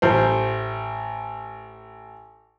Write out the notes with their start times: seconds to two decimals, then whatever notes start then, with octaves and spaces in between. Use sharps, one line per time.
0.02 A1 C5